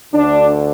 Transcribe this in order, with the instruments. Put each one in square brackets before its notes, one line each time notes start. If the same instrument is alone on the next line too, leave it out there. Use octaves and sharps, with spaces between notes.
[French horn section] D2 D3 D4